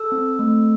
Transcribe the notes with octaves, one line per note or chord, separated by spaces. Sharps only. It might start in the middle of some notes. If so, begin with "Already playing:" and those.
Already playing: A4 E6
C4
A3